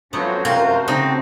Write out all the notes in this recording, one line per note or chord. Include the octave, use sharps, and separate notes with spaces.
F#3 A3 B3 C#4 F4 F#4 C5
C3 F4 A#4
C#3 C4 D#4